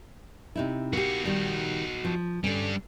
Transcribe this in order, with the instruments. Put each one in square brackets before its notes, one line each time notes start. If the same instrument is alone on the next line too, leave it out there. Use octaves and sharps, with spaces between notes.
[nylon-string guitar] C3 D#4 E4
[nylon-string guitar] A#3 G4 [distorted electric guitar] D#4 F#4
[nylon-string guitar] D#3 G3
F3
[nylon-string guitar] D3 C#4 [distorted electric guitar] G3 D4